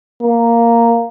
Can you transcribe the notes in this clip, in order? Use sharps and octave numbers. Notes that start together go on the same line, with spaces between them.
A#3